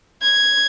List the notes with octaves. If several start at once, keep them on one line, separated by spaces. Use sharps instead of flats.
G#6